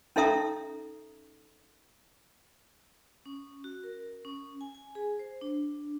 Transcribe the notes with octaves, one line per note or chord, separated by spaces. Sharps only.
C#4 D#4 A4 E5 A#5 D#6
C#4
F#4
A#4
C#4
G#5
G#5
G#4
C5
D4